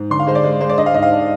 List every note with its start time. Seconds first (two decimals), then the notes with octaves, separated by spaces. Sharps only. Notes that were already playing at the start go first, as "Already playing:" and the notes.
Already playing: G#2
0.10 D3 C6
0.20 F5
0.27 G#3 C5
0.35 D5
0.44 G#3
0.61 G#3 C5
0.69 D5
0.77 D4 D#5
0.86 F5
0.94 G#2 D#5
1.03 F5
1.12 D4